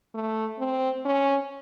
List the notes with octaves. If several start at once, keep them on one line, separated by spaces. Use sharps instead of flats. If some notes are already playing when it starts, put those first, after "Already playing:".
A3
C4
C#4